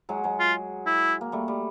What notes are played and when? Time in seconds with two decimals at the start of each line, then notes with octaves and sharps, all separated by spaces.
0.09 F#3 G#3
0.24 F#3 G#3
0.40 F4
0.86 E4
1.21 A#3
1.32 G3 A3
1.48 G3